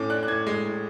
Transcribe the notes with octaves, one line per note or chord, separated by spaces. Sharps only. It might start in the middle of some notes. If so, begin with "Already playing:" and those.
Already playing: A2 C#4 D6
D4 F#6
F#6
A2 G#6
G#3
A2